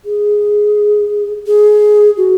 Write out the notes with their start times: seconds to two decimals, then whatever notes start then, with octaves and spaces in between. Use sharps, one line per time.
0.05 G#4
1.47 G#4
2.17 F#4